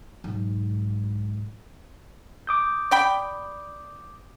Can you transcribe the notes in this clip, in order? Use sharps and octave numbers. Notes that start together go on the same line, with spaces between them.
B1 G#2
D6 D#6 G6
D5 G5 B5